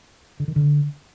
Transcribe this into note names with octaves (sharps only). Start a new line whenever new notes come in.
D3
D#3
D3